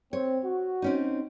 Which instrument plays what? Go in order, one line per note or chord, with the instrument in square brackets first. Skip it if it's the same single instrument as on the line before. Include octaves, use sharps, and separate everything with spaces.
[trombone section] C4 [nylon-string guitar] C#5
[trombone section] F#4
[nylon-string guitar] C4 C#4 D#4